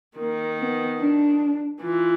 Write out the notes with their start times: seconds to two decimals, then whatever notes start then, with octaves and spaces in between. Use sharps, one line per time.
0.18 D#3 A#3
0.58 B3
1.00 D4
1.81 E3 F4